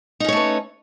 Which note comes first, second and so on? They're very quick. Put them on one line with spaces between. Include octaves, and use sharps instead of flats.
D#4 C#4 C#5 A3 B4